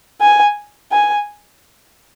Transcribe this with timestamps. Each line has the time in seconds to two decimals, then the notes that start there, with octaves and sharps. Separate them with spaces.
0.21 G#5
0.92 G#5